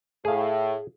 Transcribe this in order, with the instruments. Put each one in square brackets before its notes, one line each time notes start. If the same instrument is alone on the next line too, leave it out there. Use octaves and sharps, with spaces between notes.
[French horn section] A2 [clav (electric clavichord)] G#4 F5